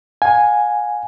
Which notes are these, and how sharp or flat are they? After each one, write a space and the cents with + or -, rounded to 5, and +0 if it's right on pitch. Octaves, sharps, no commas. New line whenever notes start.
F5 +40 G#5 +0